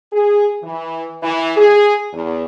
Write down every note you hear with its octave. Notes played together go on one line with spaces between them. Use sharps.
G#4
E3
E3
G#4
E2